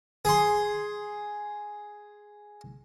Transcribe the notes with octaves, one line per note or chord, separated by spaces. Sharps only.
G#4 C6